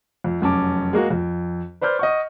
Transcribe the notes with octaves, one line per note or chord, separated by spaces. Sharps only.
F2
F1 F#2 C#4 A5 D6
G#3 A#3 F#4
F2
B4 C5 D5 F6 G6
D#5 F#5 C#6